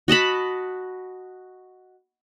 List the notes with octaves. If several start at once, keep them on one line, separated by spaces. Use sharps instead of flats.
F#4 D#5 A5 B5